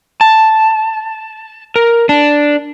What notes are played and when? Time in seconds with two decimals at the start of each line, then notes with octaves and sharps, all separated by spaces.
0.21 A5
1.76 A#4
2.09 D4